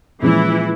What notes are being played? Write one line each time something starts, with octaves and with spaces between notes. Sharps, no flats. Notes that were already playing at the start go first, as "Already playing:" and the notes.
A#2 E3 F3 G#3 C#4 E4